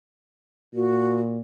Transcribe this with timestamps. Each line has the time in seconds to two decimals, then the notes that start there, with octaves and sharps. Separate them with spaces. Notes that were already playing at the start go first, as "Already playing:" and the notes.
0.74 A#2 F#4